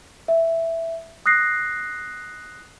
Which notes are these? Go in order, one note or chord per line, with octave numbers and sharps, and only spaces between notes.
E5
D#6 F#6 A#6 C7